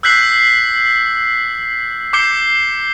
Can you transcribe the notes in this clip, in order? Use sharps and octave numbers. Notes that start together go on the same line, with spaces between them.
E6 F#6 G6 B6 C7 F#7
D6 G6 C7 C#7 G7